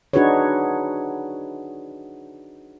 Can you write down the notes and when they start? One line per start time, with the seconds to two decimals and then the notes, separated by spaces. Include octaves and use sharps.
0.13 D4 D#4 F#4 G#4 B4 C#5